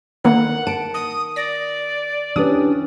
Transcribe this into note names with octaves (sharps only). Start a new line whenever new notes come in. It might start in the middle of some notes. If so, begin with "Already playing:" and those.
D3 D#3 A#3 B3 F#5
A5 D7
D#6
D5 A#6
E3 C#4 D4 G4 B4 D#6